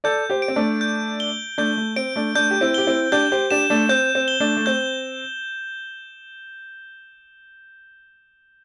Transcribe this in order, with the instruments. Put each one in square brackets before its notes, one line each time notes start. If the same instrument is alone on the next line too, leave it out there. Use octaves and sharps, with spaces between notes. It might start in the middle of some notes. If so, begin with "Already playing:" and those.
[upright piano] A4 D5 [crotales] G6
[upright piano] G4 C5
[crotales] D7
[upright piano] C4
A3 D4
[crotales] G6
G7
[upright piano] A3 D4 [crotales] G6
[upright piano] A3
[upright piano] C4 [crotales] D7
[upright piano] A3 D4
[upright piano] A3 D4 [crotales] G6
[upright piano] G4
C4 E4
[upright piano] G4 [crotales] G7
[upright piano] C4 E4
[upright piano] D4 G4 [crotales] G6
[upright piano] G4 C5
[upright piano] D4 G4 [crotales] E7
[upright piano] A3 D4
[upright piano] C4 [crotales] G6
[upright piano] C4
[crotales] G7
[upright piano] A3 D4
A3
[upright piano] C4 [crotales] G6